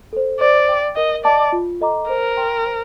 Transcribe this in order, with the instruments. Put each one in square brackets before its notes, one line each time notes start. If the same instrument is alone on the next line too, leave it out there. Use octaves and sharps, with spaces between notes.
[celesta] A4 C5
[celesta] C5 [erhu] D5
[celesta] G5 D6
[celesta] A#4 [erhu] D#5
[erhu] D5 [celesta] D#5 A5 D6
[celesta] F4
A4 D#5 A#5 D6
[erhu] A#4 [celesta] C5
[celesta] G5 C6
C5